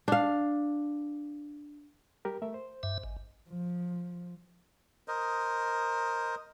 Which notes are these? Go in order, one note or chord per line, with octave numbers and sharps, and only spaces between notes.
D4 F5
G3 G4 A#4
A3 A#4 E5
C5
G2 E5
G#1
F3
A#4 C5 D#5